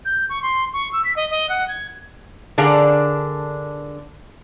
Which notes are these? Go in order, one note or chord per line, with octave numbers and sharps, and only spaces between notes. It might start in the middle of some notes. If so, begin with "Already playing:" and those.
G6
C#6
C6
C#6
E6
B6
D#5
D#5
F#5
G#6
D3 D4 G#4 A#4 F5